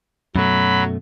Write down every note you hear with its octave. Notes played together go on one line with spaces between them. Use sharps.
F#2 B2 F#3 A3 B5